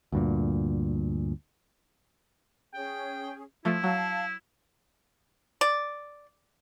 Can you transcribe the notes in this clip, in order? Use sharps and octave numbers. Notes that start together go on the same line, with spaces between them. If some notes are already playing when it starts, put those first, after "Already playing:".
D2 G2 A#2
C#4 G#4 G5
F3 A3 E4
F#3 F5 A5
D5